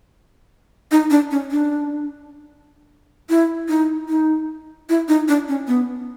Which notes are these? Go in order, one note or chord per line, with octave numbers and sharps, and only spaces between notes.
D#4
D4
C#4
D4
E4
D#4
D#4
E4
D#4
D4
C#4
B3